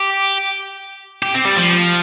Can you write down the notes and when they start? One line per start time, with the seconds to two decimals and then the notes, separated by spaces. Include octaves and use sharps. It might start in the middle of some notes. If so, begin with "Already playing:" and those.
Already playing: G4
1.23 G4
1.35 C4
1.45 G3
1.57 F3